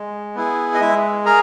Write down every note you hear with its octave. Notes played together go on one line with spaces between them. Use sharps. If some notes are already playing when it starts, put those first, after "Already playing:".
Already playing: G#3
B3 E4 G#4
D#5
G#3 E4 E5
G#4 A#4 A#5